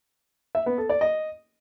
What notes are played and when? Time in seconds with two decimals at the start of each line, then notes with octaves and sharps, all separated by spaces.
0.55 E5
0.66 B3
0.78 A4
0.90 D5
1.01 D#5